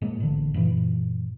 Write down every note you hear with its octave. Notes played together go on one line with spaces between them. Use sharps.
G#2 F#3 G#3 A#3
A1 D3
F#2 A#2 E3